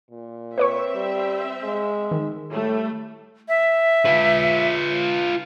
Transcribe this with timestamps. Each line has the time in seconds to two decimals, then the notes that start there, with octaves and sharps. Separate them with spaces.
0.11 A#2
0.58 C4 B4 C#5 E5 C#6
0.95 G3
1.63 G#3
2.11 D#3
2.51 A2 G3 A3
3.49 E5
4.06 F4 B4